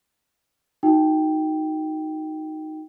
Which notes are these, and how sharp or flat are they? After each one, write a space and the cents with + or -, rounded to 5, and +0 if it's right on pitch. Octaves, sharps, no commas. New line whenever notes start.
D#4 +0 F#4 -10 G5 +0